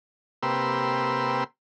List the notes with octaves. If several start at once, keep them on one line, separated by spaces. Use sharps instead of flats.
C3 A#3 G4 B4 C6 E6